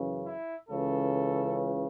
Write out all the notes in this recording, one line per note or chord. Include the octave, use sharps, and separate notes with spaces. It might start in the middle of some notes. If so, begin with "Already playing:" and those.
Already playing: F#2 C#3 E3
E4
C#2 C#3 E3 A4